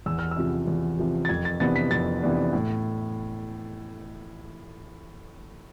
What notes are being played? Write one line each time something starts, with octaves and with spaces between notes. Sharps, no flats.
E2 E6
F6
E6
C3 F3
E2
C3 F3
A6
F2 G#6
A6
C3 E3 B3 D4 A6
B6
F2 A6
C3 E3 B3 D4
A2